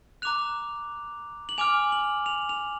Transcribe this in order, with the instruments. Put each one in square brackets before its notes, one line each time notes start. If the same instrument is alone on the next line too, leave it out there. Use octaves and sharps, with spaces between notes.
[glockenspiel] A#5 D6 F#6 F7
F#7
G#5 D6 F6 F7
F#7
F7
F7